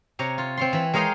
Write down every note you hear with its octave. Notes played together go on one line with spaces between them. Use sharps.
C3 C#5 A#5
F4
C4 C#5 C6
E3 B4
G#3 A#4 C#5 D#5 F5 G5